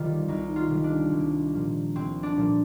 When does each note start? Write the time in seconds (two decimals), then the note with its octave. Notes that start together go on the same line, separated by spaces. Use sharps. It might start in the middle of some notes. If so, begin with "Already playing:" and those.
Already playing: C2 C3 D#3 G3 F4
0.28 C2 D#4
0.56 F4
0.70 C3 D#3 G3
0.84 D4
1.12 C2
1.54 A#2 F3
1.95 C2 C4
2.23 D4
2.37 A#2 F3